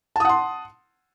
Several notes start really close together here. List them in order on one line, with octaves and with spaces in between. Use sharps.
A5 D#6 F#5 C6